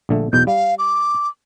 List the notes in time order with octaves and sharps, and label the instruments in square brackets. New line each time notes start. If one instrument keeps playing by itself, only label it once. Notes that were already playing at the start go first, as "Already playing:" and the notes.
[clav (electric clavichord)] A#1 D3 A3
[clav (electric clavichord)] B1 E2 B2 [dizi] G6
[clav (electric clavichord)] G3 [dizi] F5
[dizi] D6